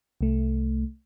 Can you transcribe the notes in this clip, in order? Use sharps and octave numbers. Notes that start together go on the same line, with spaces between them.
C2 A3